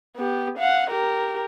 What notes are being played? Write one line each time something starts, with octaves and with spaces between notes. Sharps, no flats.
B3 G4
F5 F#5
G4 A#4